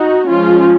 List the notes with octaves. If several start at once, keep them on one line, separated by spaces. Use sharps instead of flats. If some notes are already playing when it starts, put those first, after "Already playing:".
Already playing: D#4 F#4
F3 G#3 C#4 F4